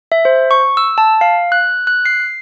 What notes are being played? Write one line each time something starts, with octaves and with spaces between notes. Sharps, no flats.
E5
C5
C#6
E6
A5
F5
F#6
F#6
C7